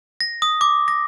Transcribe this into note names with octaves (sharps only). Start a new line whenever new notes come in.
A#6
D#6
D6
A#6